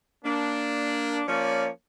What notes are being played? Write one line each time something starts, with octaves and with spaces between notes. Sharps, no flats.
A#3 D4
F3 A#3 C#4 C#5 D5